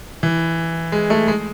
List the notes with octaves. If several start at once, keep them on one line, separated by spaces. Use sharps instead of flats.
E3
G#3
A3
G#3